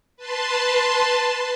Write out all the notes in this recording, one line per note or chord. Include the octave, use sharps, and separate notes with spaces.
B4 A5 C6